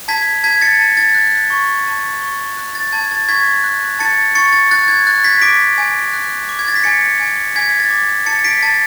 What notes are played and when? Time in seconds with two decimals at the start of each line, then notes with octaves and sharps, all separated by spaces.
0.08 A5 G#6 B6
0.43 A5 G#6 B6
0.61 A6 C#7
0.79 A5
0.97 A6
1.15 F#6
1.50 C#6
1.86 A5
2.22 C#6
2.57 F#6
2.75 A6
2.92 A5 G#6
3.11 A6
3.29 C#6 G#6 B6
3.64 F#6
3.99 A5 A6 C#7
4.35 C#6 A6 C#7
4.52 A6
4.71 F#6 A6
4.88 G#6
5.07 F#6 A6
5.24 G#6 B6
5.41 D6 B6 D7
5.78 G#5
6.13 F#6
6.49 D6
6.59 G#6
6.68 A6
6.76 B6
6.84 G#5 A6 C#7
7.19 G#5
7.56 G#5 G#6 B6
7.80 A6
7.90 D6
8.26 A5 A6 C#7
8.44 B6 D7
8.63 A5 A6